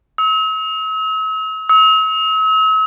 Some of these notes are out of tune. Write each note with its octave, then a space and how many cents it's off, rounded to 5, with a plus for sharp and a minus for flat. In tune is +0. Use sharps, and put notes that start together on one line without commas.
E6 -45
E6 -45